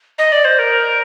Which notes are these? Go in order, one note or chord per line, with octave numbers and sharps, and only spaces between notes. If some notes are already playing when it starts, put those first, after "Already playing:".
D#5
D5
C5
A#4